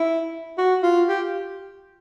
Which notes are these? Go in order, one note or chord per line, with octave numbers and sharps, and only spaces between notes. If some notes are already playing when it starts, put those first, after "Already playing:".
Already playing: E4
F#4
F4
G4